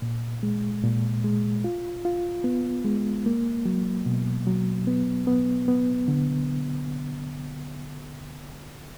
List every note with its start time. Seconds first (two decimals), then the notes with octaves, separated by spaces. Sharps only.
0.02 A#2
0.43 G#3
0.83 A#2
1.24 G#3
1.64 F4
2.05 F4
2.44 B3
2.85 G#3
3.26 A#3
3.66 F#3
4.06 B2
4.47 F#3
4.87 B3
5.27 B3
5.68 B3
6.08 D3